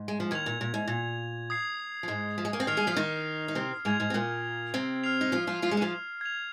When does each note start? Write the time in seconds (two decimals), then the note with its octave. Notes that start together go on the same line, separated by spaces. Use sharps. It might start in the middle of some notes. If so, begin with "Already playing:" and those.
Already playing: G#2
0.08 G#3
0.20 F3
0.31 D#2 D#3 G#6 F7
0.46 A#2
0.61 A#2
0.74 G#2
0.88 A#2
1.50 D#6 G#6 C7
2.03 F3
2.08 G#2 G#3
2.38 F3
2.45 G#3
2.53 A#3
2.60 C4
2.67 D#3 D#4 F6 C7 F7
2.77 G#3 G#4
2.87 F3 F4
2.96 D#3 D#4
3.48 D#4
3.55 C3 C4
3.85 G#2 G#3 G#6 F7
4.00 G#2 G#3
4.10 C4
4.14 A#2 A#3
4.74 C3 C4
5.04 F6 C7 F7
5.21 D#4
5.32 F3 F4
5.47 F3 F4
5.62 F3 F4
5.71 G#3 G#4
5.77 D#4
5.81 F3 F4
6.21 G#6 F7